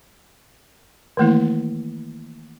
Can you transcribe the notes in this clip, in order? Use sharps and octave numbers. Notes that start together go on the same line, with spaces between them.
D#3 E3 A3 A#3 E4